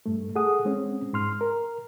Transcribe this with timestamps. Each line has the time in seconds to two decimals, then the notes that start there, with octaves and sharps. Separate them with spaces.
0.06 G2 A3
0.36 G#4 A4 F#5 D#6
0.65 G#3 C4 C#4
1.13 G#2 C6 F6
1.41 A#4